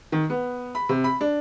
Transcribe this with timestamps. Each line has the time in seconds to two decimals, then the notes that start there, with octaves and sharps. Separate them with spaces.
0.12 D#3
0.30 B3
0.75 B5
0.89 C3
1.04 B5
1.21 D4